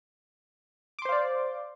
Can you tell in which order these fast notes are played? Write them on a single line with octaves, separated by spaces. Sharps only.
D6 C6 C5 F5 D5